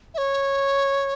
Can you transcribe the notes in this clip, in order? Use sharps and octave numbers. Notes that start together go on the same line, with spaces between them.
E5
C#5